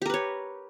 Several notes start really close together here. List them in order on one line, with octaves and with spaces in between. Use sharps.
G4 A#4 B4 C#5